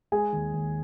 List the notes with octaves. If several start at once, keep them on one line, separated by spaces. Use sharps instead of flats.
G#3 G#4 G#5
D#2
D#2